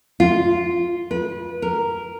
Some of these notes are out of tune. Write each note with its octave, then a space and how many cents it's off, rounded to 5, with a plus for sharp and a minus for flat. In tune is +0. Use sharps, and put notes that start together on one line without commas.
F4 -5
B4 -30
A#4 -5